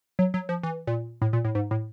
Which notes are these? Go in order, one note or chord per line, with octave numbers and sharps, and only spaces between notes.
F#3
F#3
F3
E3
A#2
A2
A#2
A2
G#2
A2